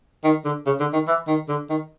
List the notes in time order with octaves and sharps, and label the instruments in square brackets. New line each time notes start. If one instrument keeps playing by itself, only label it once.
[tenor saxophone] D#3
D3
C#3
D3
D#3
E3
D#3
D3
D#3